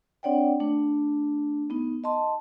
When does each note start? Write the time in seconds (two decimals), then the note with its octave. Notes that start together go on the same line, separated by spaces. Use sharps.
0.23 C4 D4 C#5 D5 F#5 G5
0.60 A3 D4
1.70 B3 D#4
2.04 D#5 A5 C6